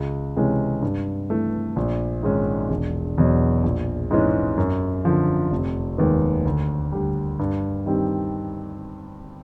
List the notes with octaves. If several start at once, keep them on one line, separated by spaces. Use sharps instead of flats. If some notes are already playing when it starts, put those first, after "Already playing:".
Already playing: C#2
C3 E3 G#3 C#4
G2
E3 A3
A#1
G#2 D#3 G#3 C#4
E1
E2 B2 F#3
A#1
G#2 E3 G#3 C#4
F#2
D3 F3
F1
D#2 D#3 G#3 B3
D2
D3 G3
G2
D#3 G3 C4